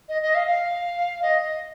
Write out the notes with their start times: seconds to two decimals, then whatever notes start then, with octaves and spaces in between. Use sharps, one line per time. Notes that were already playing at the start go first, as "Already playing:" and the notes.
0.09 D#5
0.22 D#5
0.35 F5
0.47 F5
1.22 D#5
1.42 D#5